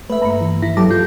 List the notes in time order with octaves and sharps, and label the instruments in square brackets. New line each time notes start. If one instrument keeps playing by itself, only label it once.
[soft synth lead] A3 [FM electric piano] B4 E5
[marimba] G2 A#3 [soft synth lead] A#5
[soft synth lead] E3
[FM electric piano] E4 [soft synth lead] A#6
[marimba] G#2 A4 [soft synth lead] F#3 [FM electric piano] G4 A5 D6
[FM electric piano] F4 [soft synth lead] G6